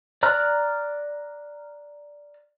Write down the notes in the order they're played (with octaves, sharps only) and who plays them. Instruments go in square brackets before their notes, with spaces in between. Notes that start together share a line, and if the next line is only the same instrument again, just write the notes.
[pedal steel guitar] D5 A#5 F6 F#6